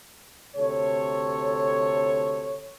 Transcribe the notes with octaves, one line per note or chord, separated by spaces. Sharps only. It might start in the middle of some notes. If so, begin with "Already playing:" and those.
D2 C3 A4 C#5